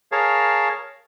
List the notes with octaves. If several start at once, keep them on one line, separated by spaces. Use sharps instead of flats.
G#4 A#4 C#5 F5 A5